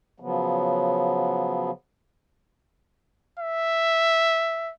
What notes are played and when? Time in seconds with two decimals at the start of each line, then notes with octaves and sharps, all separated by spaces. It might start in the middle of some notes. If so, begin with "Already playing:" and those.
0.20 C#3 F3 F#3 B3
3.39 E5